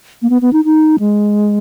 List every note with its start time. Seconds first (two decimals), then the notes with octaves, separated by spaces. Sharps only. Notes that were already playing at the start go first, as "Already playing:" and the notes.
0.22 A#3
0.30 B3
0.42 B3
0.53 D#4
0.65 D#4
0.99 G#3